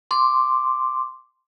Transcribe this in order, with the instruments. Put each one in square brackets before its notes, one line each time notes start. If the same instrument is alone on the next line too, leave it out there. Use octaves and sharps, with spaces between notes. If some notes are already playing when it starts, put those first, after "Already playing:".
[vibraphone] C6 D6